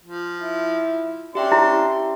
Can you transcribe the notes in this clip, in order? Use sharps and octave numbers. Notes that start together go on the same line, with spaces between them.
F3
E4
C#4 D4 G4 E5 G5 C6
E4